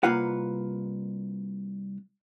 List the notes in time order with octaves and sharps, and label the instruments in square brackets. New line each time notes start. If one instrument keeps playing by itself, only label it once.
[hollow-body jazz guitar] C2 A#3 F4 B4 F#5